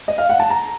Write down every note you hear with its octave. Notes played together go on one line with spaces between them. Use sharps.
D#5
F5
F#5
A5
A#5